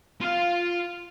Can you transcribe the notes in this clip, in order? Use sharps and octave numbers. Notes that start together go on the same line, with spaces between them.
F4 F5